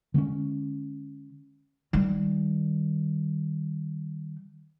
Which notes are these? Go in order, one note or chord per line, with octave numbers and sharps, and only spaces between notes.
D3 G#3 B3 C#4
D#3 G3